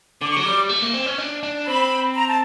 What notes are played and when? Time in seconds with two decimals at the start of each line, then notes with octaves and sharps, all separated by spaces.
0.21 D3 D6
0.30 C#6
0.36 F#3 D6
0.45 G3
0.70 A3
0.82 A#3
0.94 C4
1.06 C#4
1.18 D4
1.43 D4
1.67 C4 B5
2.15 A#5
2.27 A5